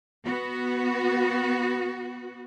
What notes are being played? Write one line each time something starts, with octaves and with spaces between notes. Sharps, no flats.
B3 F#4